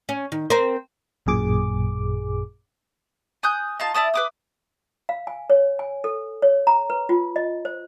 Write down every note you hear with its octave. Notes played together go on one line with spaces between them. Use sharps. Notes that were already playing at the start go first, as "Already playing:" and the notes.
C#4
D#3
C4 A#4 C5
A1 F#2 A#2 G#4 D6
G#5 D#6 F#6 G6
D#4 F4 A5
E4 D5 A5 D#6
B4 D6 D#6
F5
G#5
C#5
G#5
A4
C#5
A#5
B4
F4
D#5
C5